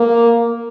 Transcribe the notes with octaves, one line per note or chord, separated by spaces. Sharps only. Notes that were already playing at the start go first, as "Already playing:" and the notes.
Already playing: A#3